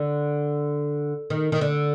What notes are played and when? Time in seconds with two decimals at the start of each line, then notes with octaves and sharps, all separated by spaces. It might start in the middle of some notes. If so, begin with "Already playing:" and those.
Already playing: D3
1.30 D#3
1.52 D#3
1.61 D3